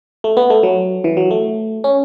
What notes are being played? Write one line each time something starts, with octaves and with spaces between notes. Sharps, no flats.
A3
B3
A3
F#3
E3
F#3
A3
C#4